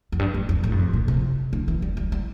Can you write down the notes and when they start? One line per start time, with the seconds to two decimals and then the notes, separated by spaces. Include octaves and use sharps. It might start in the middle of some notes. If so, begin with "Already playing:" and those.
0.12 F2
0.19 G2
0.34 G2
0.49 F2
0.64 A2
0.72 G2
0.79 F2
0.93 A#2
1.08 C3
1.53 D3
1.68 E3
1.82 G3
1.97 G3
2.12 G3